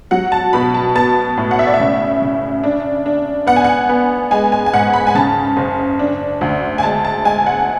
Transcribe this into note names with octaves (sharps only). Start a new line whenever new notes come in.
F#3 F#5
A5
B2 B5
A5
B3 A5
A2
F#5
E5
D5
E5
C#3
C#3
D4
D4
B3 F#5
G#5
F#5
B3
G#3 G#5
G#5
G#5
G#2 F#5
B5
G#5
C#3 A5
F#1
D4
D2
G#5
G#3 A5
A5
G#3 G#5
F#5